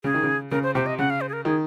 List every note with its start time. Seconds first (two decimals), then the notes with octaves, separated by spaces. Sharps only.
0.04 C#3 G#4
0.14 D#3
0.23 C#3
0.51 C#3 A#4
0.63 C5
0.75 C3 C5
0.86 D#5
0.99 C#3 F#5
1.10 F5
1.21 C5
1.29 G#4
1.33 A#4
1.45 D#3 G#4